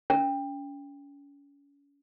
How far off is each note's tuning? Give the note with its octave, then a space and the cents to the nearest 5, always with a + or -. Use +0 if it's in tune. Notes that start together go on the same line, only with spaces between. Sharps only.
C#4 +35